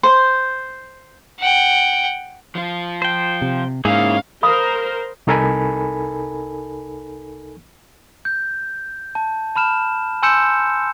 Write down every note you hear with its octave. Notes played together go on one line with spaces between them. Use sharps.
C5
F#5 G5
F3 F4
C5 G5
C3
G#2 A#3 C#4 D#4 E4 G#4 F5
A#4 C5 F5 B5 D#6
C2 D#4 A4 A#4 G#5 B5
G6
A5
A5 B5 F6 E7
G#5 C6 E6 G6 C#7 E7